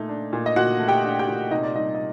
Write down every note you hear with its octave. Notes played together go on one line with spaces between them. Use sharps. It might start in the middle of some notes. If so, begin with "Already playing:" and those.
Already playing: A#2 A3 D#4
D4
A#2
D#5
A#2 F#4 F#5
A3
G4 G5
D4
G4 G5
A#2
C3 D#4 D#5
D5
G3 D#4 D#5
D#5